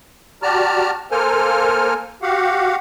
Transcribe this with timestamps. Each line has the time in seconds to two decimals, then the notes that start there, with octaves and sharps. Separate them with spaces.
0.42 F#4 G4 D5 A5 A#5 F6
1.11 A#3 A4 A#4 C5 G#5 F6
2.22 F#4 G4 F5 F#5